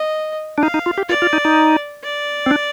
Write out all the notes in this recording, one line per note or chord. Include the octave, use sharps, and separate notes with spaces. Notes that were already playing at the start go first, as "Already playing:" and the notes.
Already playing: D#5
D4
D#4 F5
D#4
F4
G4
F4 D5
F4
D#4
D#4
D5
C4
D4